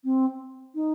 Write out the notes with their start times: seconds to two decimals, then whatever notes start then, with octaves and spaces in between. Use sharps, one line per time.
0.04 C4
0.75 D#4